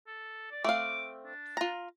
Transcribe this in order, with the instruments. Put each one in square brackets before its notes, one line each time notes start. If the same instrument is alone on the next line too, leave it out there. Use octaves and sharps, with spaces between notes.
[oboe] A4
D5
[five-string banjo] A3 C4 F5 [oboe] D6
[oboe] D4
[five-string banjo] F4 A#5